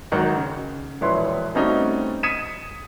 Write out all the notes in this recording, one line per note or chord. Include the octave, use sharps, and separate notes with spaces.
G#1 D#3 F#3
C#3
E1 A#1 E4 B4 C#5 C6
G3 A3 C4 C#4 D#4 F#4
D#6 G#6 B6 C#7 D#7 E7